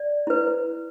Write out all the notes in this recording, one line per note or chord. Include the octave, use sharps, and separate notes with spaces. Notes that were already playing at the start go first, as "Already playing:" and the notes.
Already playing: D5
E4 B4